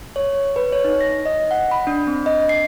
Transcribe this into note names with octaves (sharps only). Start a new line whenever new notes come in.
C#5
B4
C#5
D#4
A#6
D#5
F#5
B5
D4
C4
D#5
C7